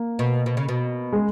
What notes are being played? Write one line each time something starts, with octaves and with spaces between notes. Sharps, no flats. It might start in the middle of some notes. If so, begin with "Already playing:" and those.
Already playing: A#3
B2
B2
C#3
B2
G#3